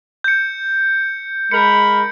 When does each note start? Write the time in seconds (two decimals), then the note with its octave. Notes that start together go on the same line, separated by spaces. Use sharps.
0.24 G6 C#7
1.51 G#3 A#4 B5 C#7